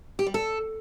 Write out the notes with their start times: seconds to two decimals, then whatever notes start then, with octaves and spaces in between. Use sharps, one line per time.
0.19 G4
0.27 G3
0.34 A4